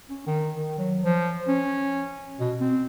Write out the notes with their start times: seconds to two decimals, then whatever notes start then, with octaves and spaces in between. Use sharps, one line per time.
0.10 C#4
0.27 D#3
0.56 D#3
0.78 F#3
1.03 F3
1.48 C#4
2.40 B2
2.61 C4